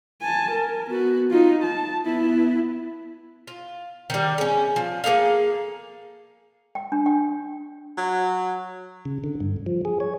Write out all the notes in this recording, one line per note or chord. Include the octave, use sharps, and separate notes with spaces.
G#5 A5
A#4
B3 F#4
D#4 F4
A5
B3 E4
F4
D#3 G3
G#3 C#4
F3
A#3 G#4 A4 F5
G5
D4
G5
F#3
C#3
D3
G2
F3
G#4
C#5